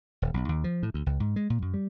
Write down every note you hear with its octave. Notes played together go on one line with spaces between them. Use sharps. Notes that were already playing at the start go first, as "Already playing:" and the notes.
D#1
B1
D#2
F3
A2
D2
C#2
G#2
G#3
A#2
F#2
G3